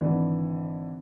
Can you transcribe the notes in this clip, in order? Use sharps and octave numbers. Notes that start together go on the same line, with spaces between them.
G#1 D3 E3